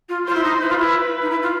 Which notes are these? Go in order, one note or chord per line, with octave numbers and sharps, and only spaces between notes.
F4
F4 C5
E4
D#4
E4 B4
F4
E4
D#4
E4
F4